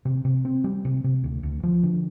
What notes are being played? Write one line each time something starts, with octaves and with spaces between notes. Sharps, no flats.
C3
C3
C4
G3
C3
C3
D2
D2
F3
D3